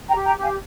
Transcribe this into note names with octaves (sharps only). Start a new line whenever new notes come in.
G5 A#5
G4
G5 A#5
G4
F5 G#5